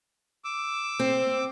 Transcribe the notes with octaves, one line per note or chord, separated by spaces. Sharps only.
D6 E6
C4